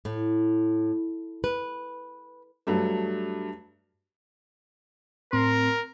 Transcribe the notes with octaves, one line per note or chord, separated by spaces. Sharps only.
A2
B4
G2 F#3 A3
A2 C4 A#4 C6